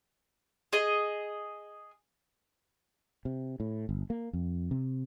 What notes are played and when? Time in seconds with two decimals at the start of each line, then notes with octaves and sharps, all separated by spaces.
0.73 G#4 D#5
3.25 C3
3.60 A2
3.89 G1
4.10 A#3
4.33 F2
4.71 C3